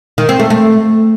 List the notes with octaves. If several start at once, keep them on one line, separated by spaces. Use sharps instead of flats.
D#3
C4
A3
A3